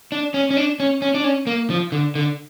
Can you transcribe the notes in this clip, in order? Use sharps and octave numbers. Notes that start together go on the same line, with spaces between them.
D4
C#4
C#4
D4
C#4
C#4
D4
C#4
A#3
F3
D3
D3